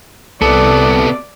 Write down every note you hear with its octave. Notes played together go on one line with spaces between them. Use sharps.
C2 C3 B3 A4 D5